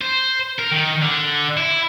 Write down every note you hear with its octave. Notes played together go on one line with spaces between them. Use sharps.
C5
A#4
D#3
D3
E4